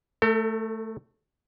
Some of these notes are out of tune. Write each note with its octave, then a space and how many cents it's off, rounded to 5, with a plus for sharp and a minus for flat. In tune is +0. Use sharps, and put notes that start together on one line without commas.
A3 +0 A4 +45